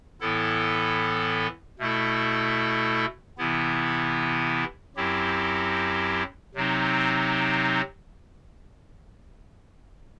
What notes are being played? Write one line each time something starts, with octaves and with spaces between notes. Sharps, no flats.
A2 E3 B3 E4 A4
B2 A3 E4 A4
C3 E3 B3 E4
F#2 F#3 C4 E4 G4
C3 F#3 C4 D#4